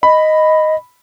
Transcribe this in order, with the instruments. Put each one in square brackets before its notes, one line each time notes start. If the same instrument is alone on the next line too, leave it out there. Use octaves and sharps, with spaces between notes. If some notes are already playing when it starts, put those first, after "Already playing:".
[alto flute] D#5 [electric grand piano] B5